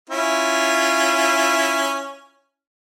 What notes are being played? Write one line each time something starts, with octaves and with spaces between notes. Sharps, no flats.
C#4 E4 F4